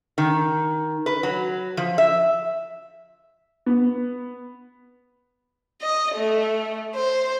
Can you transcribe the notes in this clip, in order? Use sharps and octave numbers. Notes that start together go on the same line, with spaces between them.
D#3
B4
F#3
F3
E5
B3
D#5
A3
C5